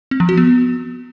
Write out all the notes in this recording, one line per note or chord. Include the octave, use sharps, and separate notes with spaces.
C4
F3
F#4
B3